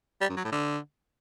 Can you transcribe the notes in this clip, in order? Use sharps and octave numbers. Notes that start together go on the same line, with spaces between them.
G3
F#2
F#3
A2
D3